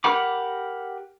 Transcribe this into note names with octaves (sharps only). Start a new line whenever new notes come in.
G4 A#4 F#5 B5 D6